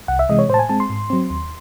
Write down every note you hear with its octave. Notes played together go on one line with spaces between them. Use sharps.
C2 F#5
E5
C3 E3 G#3 D#5
C#5
A2 C5
A5
G#5
G#3 C4 A5
C6
G#2
F#3 C4
D#2